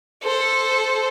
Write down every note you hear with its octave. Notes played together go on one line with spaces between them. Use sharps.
A4 C5